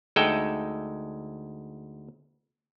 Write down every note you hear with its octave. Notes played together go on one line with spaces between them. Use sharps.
D2 G#3 D#4 A4 E5 G5